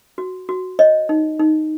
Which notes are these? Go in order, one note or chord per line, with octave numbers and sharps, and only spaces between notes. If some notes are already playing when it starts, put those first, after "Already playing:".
F#4
F#4
C#5 D#5
D#4
D#4